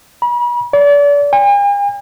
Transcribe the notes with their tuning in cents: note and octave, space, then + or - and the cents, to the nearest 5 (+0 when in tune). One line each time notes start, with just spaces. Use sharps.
B5 -40
D5 -35
G#5 -45